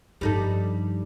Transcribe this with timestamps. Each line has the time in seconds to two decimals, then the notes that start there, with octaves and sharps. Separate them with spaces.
0.21 G2 F3 G3 D#4 A4